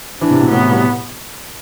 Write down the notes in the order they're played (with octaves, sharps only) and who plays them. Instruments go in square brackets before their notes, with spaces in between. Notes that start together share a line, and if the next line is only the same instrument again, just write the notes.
[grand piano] E3 [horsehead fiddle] D4
[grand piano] C3
B2
[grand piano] A2 [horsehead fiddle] B3
[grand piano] E3
G3